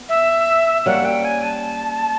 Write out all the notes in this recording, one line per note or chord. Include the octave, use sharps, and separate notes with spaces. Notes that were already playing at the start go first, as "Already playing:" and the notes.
Already playing: B3
E5
G3 A#3 C#4 F#5
G5
G#5
A5